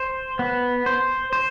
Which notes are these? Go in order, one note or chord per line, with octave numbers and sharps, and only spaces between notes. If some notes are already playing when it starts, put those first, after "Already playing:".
Already playing: C5
B3
C5
C5